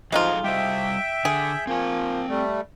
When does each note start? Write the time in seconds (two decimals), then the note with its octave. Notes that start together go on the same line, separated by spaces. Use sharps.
0.12 F3 F#3 G#3 D#4 F4 A4 F5
0.44 G3 C5 E5 G5
1.25 D3 G#4
1.67 F3 A#3 C4 G#5
2.29 G3 A3